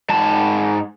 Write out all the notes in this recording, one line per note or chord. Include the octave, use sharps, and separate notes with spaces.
G#2 A5